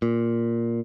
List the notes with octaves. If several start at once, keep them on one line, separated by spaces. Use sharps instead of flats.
A#2